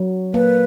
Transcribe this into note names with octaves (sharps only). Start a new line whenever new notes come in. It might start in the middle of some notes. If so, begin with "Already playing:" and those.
Already playing: F#3
A#3 B4